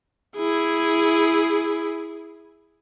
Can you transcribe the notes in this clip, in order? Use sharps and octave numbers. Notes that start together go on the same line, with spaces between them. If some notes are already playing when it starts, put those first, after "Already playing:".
E4 G#4